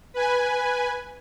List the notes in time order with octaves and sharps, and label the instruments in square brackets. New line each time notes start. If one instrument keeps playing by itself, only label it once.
[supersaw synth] B4 G#5